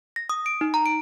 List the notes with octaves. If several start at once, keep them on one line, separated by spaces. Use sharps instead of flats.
A#6
D#6
D7
D#4
A#5
D7